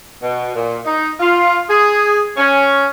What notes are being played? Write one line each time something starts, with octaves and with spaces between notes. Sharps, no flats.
B2
A#2
D#4
F4
G#4
C#4